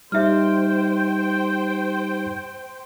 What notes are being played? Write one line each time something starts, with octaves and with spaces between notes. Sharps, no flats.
G3 D#4 G4 C5 E5 G5 F6